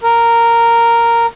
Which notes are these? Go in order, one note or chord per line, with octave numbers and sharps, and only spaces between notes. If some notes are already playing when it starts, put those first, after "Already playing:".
A#4